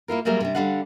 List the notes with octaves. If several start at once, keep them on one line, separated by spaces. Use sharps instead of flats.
A#3 E4 F4 A#4
F#3 G3 A#3 G#4 A#4 E5
C3 G3 D4
D3 G3 D4 F4 F5 F#5